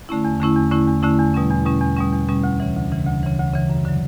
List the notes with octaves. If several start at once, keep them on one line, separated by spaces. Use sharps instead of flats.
D3 A3 C#4 E4
E2
D3 A3 C#4 E4
E2
D3 A3 C#4 E4
E2
D3 A3 C#4 E4
E2
B2 G3 C#4
E2
B2 G3 C#4
E2
B2 G3 C#4
E2
B2 G3 C#4
D2
C#3 E3
D2
C#3 E3
D2
C#3 E3
D2
C#3 E3
F#2
D3 F#3